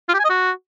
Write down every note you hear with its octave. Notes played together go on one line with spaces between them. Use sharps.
F4
G4
G#5
D#5
F#4